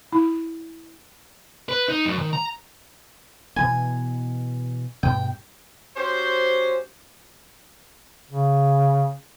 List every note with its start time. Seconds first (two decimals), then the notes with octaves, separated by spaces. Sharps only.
0.12 E4
1.69 B4
1.88 D#4
2.06 F#2
2.19 D#3
2.33 A#5
3.56 B2 E3 B3 G#5
5.03 G2 B2 G5
5.96 C#4 F#4 G4 C5
8.31 C#3